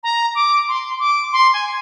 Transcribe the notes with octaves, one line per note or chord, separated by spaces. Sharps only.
A#5
D6
C6
D6
C6
G#5